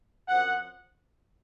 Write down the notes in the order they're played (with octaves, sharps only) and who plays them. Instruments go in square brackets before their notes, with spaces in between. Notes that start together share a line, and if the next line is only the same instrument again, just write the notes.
[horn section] F#2 F3 C4 F#5